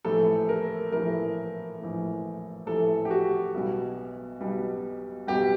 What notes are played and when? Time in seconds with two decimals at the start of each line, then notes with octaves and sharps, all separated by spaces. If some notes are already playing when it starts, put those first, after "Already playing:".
0.05 A#1 A2 E3 A3 A4
0.49 A#4
0.92 A#1 A2 E3 A3 A#4
1.80 A#1 A2 E3 A3
2.66 A#1 A2 E3 A3 A4
3.05 G4
3.11 F#4
3.54 B1 B2 G3
4.41 B1 B2 G3
5.27 B1 B2 G3 G4